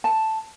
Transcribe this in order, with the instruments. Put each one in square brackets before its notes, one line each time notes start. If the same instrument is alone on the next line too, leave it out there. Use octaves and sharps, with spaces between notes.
[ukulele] A5